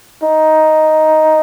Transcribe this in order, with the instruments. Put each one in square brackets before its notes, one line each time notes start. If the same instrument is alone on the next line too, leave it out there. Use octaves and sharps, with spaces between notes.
[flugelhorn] D#4